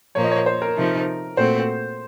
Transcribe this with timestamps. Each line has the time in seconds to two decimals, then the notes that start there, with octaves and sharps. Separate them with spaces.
0.15 A#2 F3 A#3 C#5
0.24 D#5
0.31 C#5
0.46 C5
0.62 A#4
0.76 C3 F3 A3 D#4
1.36 A#2 A3 C4 F#4 C5